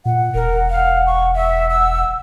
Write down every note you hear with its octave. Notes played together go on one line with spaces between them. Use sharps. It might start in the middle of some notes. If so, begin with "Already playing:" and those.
A#2 F#5
E1 A#4
F5
C#6
E5 F#5
E6